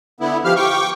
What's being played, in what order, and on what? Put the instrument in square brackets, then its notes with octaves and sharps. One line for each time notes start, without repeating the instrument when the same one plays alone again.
[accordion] D3 B3 E4
F3 G4 F5 F6
G5 C#6 D6